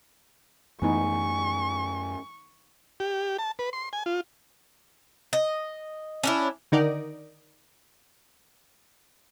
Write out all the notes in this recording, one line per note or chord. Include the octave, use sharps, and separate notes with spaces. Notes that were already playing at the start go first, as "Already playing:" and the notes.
F#2 E3 A3 B3 D#4 G#5 C#6
G4
A5
B4
C6
G#5
F4
D#5
C#4 D4 E4
D3 D#3 D#4 A#4 D5